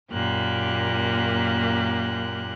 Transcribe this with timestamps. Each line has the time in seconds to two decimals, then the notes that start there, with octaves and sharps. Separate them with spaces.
0.12 F#2 A#2 A#3 G4 F#6